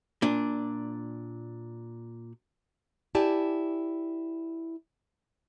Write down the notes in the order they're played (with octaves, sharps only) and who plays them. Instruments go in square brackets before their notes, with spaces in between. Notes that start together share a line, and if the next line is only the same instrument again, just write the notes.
[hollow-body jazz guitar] A#2 D4
[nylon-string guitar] E4 G4 D5 G#5 A5